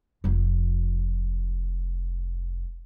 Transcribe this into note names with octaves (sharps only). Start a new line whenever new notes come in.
F1 F3